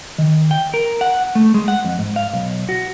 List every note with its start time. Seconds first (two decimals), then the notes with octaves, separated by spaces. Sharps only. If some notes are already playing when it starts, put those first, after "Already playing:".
0.18 D#3
0.51 G5
0.74 A#4
1.01 F#5
1.35 A3
1.54 G#3
1.68 F#5
1.85 F2
1.99 G#2
2.16 F5
2.34 B1
2.69 F#4